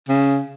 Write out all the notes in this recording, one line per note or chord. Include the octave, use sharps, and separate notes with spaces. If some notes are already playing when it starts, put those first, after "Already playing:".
C#3